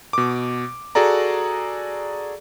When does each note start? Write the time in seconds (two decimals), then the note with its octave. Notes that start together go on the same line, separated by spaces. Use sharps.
0.13 B2 D6
0.95 F#4 G#4 A4 D5 A#5